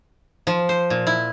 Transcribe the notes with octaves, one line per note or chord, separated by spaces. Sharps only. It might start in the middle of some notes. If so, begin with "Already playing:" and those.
F3
C5
A#2
E4